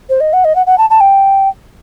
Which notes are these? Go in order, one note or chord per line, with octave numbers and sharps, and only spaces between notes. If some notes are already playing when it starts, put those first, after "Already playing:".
C5
D#5
F#5
D#5
F#5
F#5
A5
A5
G5